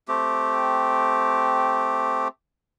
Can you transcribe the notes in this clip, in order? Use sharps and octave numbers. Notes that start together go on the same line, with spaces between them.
A3 C4 G4